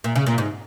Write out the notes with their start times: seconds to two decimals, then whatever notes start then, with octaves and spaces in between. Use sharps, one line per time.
0.04 A#2
0.16 C#3
0.26 A#2
0.38 G#2